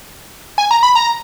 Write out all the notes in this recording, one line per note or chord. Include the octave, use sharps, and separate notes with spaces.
G#5
A#5
B5
A#5